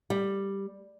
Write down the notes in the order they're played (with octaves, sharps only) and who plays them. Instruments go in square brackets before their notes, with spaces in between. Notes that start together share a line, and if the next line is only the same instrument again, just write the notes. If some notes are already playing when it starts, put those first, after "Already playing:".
[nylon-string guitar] G3